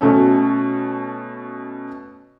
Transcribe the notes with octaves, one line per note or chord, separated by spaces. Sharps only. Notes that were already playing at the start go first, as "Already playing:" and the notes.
B2 A3 C#4